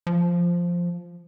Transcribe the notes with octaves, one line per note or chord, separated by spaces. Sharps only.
F3